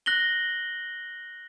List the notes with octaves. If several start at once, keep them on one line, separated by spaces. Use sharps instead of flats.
F#6 A#6 F#7 G7